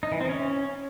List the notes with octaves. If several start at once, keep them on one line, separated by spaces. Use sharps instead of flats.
D#4
E3
C4
C#4